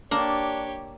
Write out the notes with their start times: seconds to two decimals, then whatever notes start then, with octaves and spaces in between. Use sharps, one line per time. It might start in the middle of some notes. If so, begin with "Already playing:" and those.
0.11 A#3 D4 G4 C#5